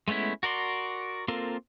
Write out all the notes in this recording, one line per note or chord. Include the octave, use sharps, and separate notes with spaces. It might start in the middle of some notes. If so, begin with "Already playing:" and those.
G#3 A3 B3 C#4 E4
F#4 A#4 D5 C6
A#3 C4 F4 A4 A#4